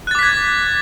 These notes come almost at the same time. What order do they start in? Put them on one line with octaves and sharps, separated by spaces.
F#6 A6 D6 B6 G#6